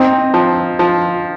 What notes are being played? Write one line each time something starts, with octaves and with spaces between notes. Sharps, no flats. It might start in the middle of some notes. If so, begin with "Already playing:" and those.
Already playing: C4 D#4
F3
F3